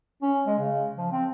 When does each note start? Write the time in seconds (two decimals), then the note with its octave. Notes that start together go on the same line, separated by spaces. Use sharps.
0.22 C#4
0.47 G#3
0.58 C#3
0.98 F3
1.12 C4